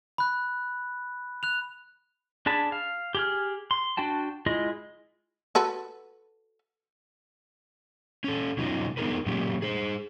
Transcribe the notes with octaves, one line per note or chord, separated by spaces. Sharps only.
B5 F#6
F#6 F7
D4 G#4 A5 B5
F5
G4 G#4 F6
C6
D4 F#4 G5 A5
G#3 E4 F4 G#4 D#5
F#4 A4 B4
C#4 A4
B2 F#3 C#4 D#4 F4
B3 D#4 F#4 G#4 A#4 B4
A#2 F#3 A#3 C#4 G4
G#4 C5